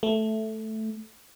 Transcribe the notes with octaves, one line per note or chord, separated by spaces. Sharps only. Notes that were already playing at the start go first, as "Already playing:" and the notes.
A3